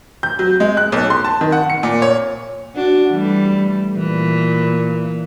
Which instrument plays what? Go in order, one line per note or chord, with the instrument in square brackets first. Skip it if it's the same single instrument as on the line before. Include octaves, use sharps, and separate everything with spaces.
[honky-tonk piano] G6
F#3
G#3
F#6
B1
C6
A5
D#3
F#5
C#7
A#2
C#5
[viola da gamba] D4 F#4
E3 G3 A3
A#2 E3